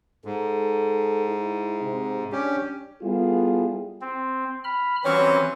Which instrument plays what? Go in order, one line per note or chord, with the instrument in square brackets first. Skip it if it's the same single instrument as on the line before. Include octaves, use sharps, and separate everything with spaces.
[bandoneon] G#2 [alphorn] A4
[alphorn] E4
C3
[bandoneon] C#4 G4 [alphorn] D4
[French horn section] G3 B3 E4 F4 G#4 A4
[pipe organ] C4
B5 F6
[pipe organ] E3 C4 [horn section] F#3 G3 C#4